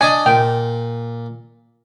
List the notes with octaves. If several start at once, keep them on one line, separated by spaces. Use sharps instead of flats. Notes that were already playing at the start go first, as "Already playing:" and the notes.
D4 D5 D#5 G#5
A#2 G5